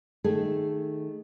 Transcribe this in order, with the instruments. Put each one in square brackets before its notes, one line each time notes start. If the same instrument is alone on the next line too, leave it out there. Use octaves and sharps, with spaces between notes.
[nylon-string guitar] D#3 A3 G#4 A4